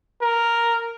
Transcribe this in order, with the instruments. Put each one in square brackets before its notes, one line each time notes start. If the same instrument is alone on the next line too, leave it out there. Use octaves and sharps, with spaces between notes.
[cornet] A#4